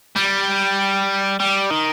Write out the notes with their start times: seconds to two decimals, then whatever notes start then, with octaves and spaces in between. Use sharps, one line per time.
0.16 G3
1.40 G3
1.70 D#3